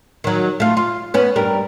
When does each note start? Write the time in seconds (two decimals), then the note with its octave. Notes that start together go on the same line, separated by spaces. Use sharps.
0.24 D#3 F#3
0.60 A3 F4
0.77 F4
1.14 B3 C#4
1.36 G2 G3 A#4